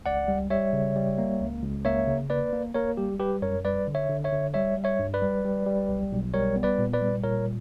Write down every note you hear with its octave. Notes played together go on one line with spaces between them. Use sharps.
C#2 D5 F#5
G3
G3 C#5 E5
C#3
G3
A#3
C#2
C#2
A#3 C#5 E5
C#3
A#3 B4 D5
A#3
A#3 A#4 C#5
G3 G4
G3 G4 B4
F#2 A#4 C#5
G3 B4 D5
D3
C#5 E5
D3
C#5 E5
D3
G3 C#5 E5
G3
C#5 E5
G2
B4 D5
G3
G3
G3
B1
B1
G3 A#4 C#5
B3
B4 D5
A#2
B4 D5
G3
A#2 A#4 C#5